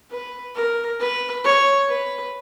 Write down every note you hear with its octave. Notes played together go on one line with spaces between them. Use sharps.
B4
A#4
B4
C#5
B4